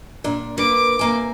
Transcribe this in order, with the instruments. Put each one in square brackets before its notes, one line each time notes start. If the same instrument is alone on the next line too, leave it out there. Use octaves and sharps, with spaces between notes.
[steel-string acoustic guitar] A#2 D4
[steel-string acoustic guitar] A#3 B4 [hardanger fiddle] D6
[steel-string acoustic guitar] C3 A#3 G#5